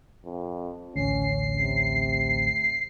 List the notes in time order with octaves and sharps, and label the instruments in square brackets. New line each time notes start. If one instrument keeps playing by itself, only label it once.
[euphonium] F2
[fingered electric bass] A1 D2 [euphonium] C#4 [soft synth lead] C7
[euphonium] C3